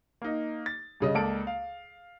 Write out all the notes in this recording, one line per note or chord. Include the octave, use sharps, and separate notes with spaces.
A#3 D#4
A6
G2 C#3 D#5
C#2 A#3 A4 D5 D7
F5